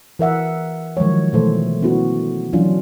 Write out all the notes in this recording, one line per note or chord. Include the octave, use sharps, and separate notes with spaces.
E3 A#4 E5 F#5
D#3 F3 F#3 G#3 C#5
B2 E3 A3 A4 C5
B3 C#4 E4 F#4
E3 F#3 C#4 D4 F4